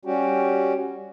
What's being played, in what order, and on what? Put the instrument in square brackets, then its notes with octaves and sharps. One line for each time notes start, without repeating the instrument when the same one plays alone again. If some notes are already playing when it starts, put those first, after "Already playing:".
[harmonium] G3 C#4 F#4 G4